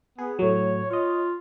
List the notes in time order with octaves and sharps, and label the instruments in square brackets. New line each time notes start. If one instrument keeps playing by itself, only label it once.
[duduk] B3 [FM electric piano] G#4
[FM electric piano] A2 F#3 [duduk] C#5
[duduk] F4 [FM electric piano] C#5 D#5